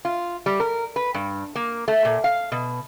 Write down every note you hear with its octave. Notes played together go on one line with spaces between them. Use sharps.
F4
G3
A#4
B4
G2
A#3
A3
A#2
F5
B2